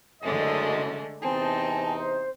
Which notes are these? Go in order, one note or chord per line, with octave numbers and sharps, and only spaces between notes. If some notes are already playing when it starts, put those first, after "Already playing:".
F#1 F#2 D3 G#3 A3 D#5
E2 C3 C4 D#4 G#5 A5
C5